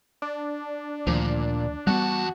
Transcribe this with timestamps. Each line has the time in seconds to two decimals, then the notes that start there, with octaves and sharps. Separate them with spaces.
0.22 D4
1.07 D2 A#2 D#3 F3
1.87 E2 G3 A3 B3 F#4 A5